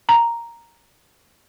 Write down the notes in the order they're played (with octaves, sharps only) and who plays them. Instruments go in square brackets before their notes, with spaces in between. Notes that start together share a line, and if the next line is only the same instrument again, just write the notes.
[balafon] A#5